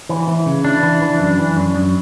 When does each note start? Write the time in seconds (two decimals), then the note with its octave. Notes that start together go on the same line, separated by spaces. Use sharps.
0.09 E3
0.28 E3
0.46 C#3
0.65 E3 D4
0.83 E3
1.02 E3
1.20 F#2
1.38 E3
1.57 F#2
1.75 F#2